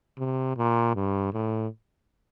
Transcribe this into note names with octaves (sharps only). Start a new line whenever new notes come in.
C3
A#2
G2
A2